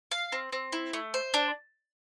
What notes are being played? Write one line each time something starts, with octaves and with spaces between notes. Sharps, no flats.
F5
C4
C4
E4
A3
C5
D4